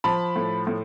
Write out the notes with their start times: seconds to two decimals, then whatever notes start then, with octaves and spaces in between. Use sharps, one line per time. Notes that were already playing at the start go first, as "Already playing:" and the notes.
0.04 F3 A5 B5
0.36 A2
0.67 A2